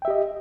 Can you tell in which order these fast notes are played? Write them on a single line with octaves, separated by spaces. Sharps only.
G5 E5 G4 D#5